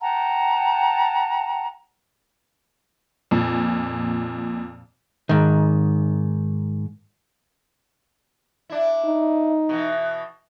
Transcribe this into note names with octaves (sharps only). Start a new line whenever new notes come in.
F#5 G5 A5 A#5
F2 A#2
G#2 D#3
D4 E4
D#4
B2 E3